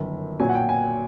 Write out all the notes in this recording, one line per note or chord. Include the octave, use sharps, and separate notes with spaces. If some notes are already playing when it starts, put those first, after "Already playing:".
Already playing: G1 F#2 D#3
B1 A#2 F#3 G#5
F#5
G5
G#5